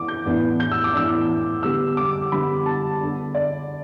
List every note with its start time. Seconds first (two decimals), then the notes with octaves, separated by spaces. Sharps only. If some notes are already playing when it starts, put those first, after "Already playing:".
Already playing: E3 B3 D4 D6
0.08 G6
0.25 A2 E3 B3 D4
0.60 G6
0.72 E6
0.84 D6
0.94 A2 E3 B3 D4 E6
1.63 D3 G3 B3 E6
1.97 D6
2.32 D3 G3 B3 B5
2.66 A5
3.00 D3 B3 D4
3.35 D5